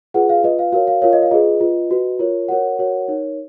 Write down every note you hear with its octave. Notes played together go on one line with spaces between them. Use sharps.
F4 G#4 B4 F#5
F5
F4 B4 D#5
F5
F#4 A#4 C#5 F5
F5
F4 A#4 C#5 F5
D#5
F5
F4 G#4 B4 D#5
F4 B4
F#4 B4
F4 A#4 C#5
F#4 A#4 C#5 F#5
F#4 A#4 C#5
D#4 A#4 C#5